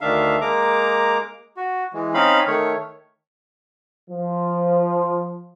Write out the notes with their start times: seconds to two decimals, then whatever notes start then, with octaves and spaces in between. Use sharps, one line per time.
0.01 D2 D#3 D4 E5 F5
0.41 G#3 A#3 A#5 D6
1.57 F#4
1.93 E3 G#3
2.14 C4 C#4 D#4 F5 B5
2.47 D#3 A3 C#5
4.10 F3